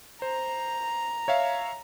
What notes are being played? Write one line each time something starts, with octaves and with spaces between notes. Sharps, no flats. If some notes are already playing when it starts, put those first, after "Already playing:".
C5 A#5
C#5 E5 F5